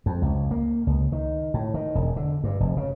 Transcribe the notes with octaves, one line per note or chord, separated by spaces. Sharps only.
F2
C#2
A#3
C#2
D#3
A2
D#3
E1
D3
G2
F1
C#3